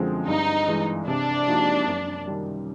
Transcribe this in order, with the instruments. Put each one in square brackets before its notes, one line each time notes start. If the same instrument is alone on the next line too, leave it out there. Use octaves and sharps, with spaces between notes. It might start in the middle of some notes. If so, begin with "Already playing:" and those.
Already playing: [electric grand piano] F#2 D3 F3 G#3 C4
[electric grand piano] G2 [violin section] D#4
[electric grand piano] E3 G#3
[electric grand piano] C3 [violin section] D4
[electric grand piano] F3 A#3 D#4 F#4
F#2
D#3 G3